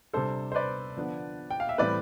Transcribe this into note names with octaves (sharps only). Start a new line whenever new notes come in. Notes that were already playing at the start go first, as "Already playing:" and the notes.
C3 G3 D4 A4 C5
C5
B4 D5
D3 F3 B3 D4
G5
F5
E5
A2 E3 G3 C4 B4 D5